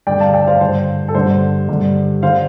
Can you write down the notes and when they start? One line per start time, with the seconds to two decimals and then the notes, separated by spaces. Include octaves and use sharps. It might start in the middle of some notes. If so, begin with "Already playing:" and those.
0.07 G2 D3 D5 G5
0.20 F5 A5
0.34 D5 G5
0.47 C5 F5
0.61 G2 D3 C5
1.08 A4
1.15 G2 D3 C5
1.69 G2 D3
2.23 D3 C5 F5